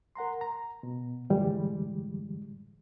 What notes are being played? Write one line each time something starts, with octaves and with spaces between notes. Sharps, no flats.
A#4 F#5 A#5 C6
A#5
B2
F#2 A2 D3 E3 G3 G#3